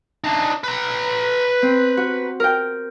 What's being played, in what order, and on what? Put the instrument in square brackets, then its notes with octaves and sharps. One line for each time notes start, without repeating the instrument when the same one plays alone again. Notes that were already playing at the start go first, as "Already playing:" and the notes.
[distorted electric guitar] D4 D#4
B4 A#5
[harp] C4
F#4
A#4 G5